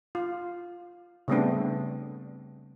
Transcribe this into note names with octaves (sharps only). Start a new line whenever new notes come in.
F4
C#3 G3 A3 B3 C4 D4